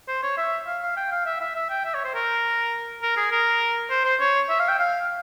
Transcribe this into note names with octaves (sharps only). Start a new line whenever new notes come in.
C5
C#5
E5
F5
F5
G5
F5
E5
E5
E5
G5
E5
C#5
C5
A#4
A#4
G#4
A#4
C5
C5
C#5
E5
F5
G5
F5